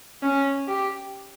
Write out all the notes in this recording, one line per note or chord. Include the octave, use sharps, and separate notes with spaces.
C#4
G4